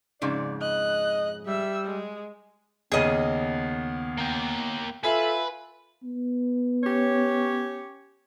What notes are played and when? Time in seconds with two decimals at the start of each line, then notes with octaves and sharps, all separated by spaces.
0.22 F2 G#2 C#3 D5
0.62 D#5 F#6
1.46 G3 E5 E6
1.85 G#3
2.92 D#2 C#3 B3 G#4 D#5
4.18 A#3 G5
5.04 F4 A4 B4 E5 G#5
6.03 B3
6.83 C#4 G4 C#5